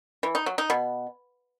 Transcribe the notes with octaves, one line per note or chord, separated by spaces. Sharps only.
E3
D#4
F#3
D#4
B2